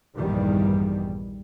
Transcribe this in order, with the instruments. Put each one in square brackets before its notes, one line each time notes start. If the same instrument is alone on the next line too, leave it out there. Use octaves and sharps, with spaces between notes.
[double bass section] A#1 E2 G2 D#3 G3